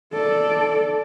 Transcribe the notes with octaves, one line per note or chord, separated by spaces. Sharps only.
A4 D5